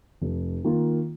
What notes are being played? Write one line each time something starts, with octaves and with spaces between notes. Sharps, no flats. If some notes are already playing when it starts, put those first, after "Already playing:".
F1
D#3 A#3 F4